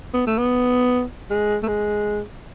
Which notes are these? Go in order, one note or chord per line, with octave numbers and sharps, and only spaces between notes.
B3
A3
B3
G#3
A3
G#3